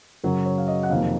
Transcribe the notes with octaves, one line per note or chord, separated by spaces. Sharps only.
F#2 C#3 F#3 A#4
C#5
F5
D#5
F#5
F2 C3 D#3 F#3 A#3 F5